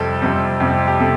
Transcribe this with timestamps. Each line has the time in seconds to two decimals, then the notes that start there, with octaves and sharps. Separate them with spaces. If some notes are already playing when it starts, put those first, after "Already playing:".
Already playing: F2 C3 G3 C4 A4
0.22 F2 C3 G3 C4
0.60 F2 C3 G3 C4
0.88 G4
1.00 C3 A4